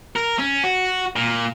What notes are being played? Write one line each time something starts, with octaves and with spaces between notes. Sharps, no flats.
A#4
C#4
F#4
A#2